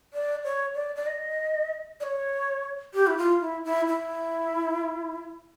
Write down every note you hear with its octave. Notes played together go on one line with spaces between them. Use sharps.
D5
C#5
D5
D5
D#5
D5
C#5
G4
E4
F4
E4
E4
E4